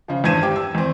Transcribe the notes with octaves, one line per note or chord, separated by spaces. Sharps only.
C#3 F3
E2 G2 C5 G#6 D#7 E7
G4
E6
E2 C4